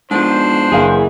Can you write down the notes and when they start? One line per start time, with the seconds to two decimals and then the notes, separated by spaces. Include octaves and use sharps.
0.11 G#2 B2 F3 D4 C5
0.72 F#1 E3 E4 G#4 F5